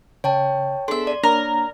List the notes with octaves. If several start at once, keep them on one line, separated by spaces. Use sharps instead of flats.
C#3 C#5 G5 A5
B3 D4 G#4 A4 E5 C6
D5
A#3 D4 A#4 C#5